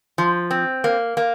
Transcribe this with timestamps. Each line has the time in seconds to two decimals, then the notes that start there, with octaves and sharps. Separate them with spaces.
0.18 F3
0.51 C4
0.84 A#3
1.17 A#3